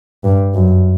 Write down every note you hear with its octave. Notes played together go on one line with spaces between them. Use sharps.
G2
F#2